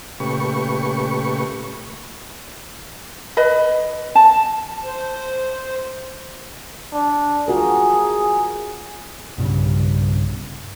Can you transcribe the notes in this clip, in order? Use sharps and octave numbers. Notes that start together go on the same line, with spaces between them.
A#2 C#3 A3 G4 B4 C#6
B4 D#5 B5
A5
C5
D4
F4 F#4 G#4 A#4
B1 G2 C#3